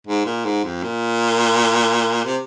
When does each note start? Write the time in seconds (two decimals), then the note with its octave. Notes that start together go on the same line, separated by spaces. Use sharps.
0.07 G#2
0.26 A#2
0.45 G#2
0.64 F2
0.83 A#2
2.25 C3